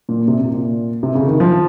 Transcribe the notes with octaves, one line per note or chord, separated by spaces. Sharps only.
A#2
C3
A#2
A#2
C3
C#3
D#3
F3